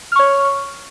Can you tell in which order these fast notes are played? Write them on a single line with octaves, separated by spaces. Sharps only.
F6 C#6 C#5